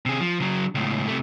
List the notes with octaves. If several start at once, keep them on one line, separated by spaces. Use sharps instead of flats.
C3 G#4
F3
C#3 F#3
C#2 A2
C3 A3